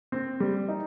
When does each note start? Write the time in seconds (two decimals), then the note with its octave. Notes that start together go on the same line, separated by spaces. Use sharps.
0.12 C4
0.40 G3
0.68 D#4